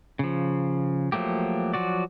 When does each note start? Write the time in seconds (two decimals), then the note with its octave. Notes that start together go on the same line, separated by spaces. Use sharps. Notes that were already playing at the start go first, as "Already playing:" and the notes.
0.19 C#3 F3
1.12 F3 F#3 A3 A#3 G4
1.74 F3 F#3 F#4 D5